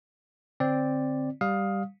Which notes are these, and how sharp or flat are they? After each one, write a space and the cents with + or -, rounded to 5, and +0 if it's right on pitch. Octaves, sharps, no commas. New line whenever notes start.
D3 +0 C4 +0 D5 +0
G3 +0 F5 +15 D#6 +10